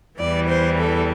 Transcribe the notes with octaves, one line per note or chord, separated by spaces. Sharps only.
E2 E3 G3 D5
C5
A4